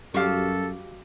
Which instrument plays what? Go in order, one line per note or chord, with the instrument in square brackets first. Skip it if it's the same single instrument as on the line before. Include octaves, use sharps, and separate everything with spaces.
[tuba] F#2 [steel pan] G3 [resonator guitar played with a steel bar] F#4 G4 F5 [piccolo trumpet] A4